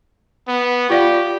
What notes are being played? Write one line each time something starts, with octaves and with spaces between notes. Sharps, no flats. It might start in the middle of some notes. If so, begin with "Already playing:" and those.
B3
F4 G4 D5 F5